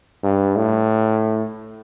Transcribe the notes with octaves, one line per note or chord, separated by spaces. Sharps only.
G2
A2